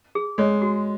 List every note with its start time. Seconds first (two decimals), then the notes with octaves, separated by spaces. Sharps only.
0.15 G#4
0.38 G#3 C#5
0.62 F#4